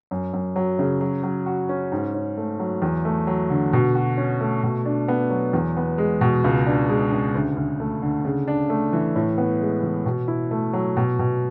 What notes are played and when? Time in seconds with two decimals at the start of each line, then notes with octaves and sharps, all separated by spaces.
0.11 F#2
0.33 F#2
0.56 F#3
0.79 C#3
1.01 F#3
1.23 F#3
1.46 F#4
1.69 C#4
1.92 G#2
2.14 C#4
2.37 A3
2.59 F#3
2.82 E2
3.05 A3
3.27 F#3
3.50 D3
3.73 B2
3.95 F#4
4.17 C#4
4.41 A3
4.63 B2
4.86 D4
5.08 B3
5.30 F#3
5.53 E2
5.77 B3
5.98 G#3
6.21 B2
6.44 C#2
6.67 D4
6.89 G#3
7.12 C#3
7.35 D2
7.56 D2
7.80 A3
8.02 D3
8.25 C#3
8.48 D4
8.70 A3
8.93 E3
9.16 A2
9.38 B3
9.61 G#3
9.83 E3
10.06 B2
10.28 E4
10.51 A3
10.73 F#3
10.97 B2
11.19 B2